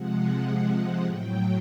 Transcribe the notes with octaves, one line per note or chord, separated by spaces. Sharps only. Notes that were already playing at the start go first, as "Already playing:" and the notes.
Already playing: C3 F3 G#3 F#5
A2 F#3 G5